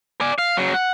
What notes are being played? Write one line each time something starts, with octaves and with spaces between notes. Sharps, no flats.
D5 G#5
F5
C#3 F#3
F#5